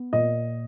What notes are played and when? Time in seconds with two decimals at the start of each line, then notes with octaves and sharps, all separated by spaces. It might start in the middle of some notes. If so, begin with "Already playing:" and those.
Already playing: B3
0.13 A#2 D#5